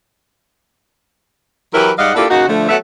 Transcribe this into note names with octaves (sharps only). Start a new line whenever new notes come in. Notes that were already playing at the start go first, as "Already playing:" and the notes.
E3 F#3 E4 G4 A#4 B4
G#2 G3 D#5 F5 F#5
A#3 D4 E4 F4 G4 A4
C#3 A#3 D#4 F#4
D3 F3 A3
F#3 A3 B3 E5 F#5